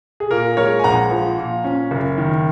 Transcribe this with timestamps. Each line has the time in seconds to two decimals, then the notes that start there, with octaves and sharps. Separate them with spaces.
0.20 G#4
0.31 A#2 A#4
0.57 G#3 A#4 C#5
0.79 G#5
0.84 A#1 F#5 A#5
1.11 F3
1.38 A#2
1.64 C#4
1.91 F#1
2.18 D#3